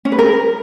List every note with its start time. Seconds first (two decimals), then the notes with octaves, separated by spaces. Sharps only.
0.05 C#4
0.12 B4
0.19 A#4